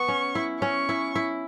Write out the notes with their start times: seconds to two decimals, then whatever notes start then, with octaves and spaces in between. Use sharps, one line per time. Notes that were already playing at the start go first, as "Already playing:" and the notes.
Already playing: B3 C#6
0.08 C#4
0.35 E4
0.62 C#4 C#6
0.89 E4
1.15 E4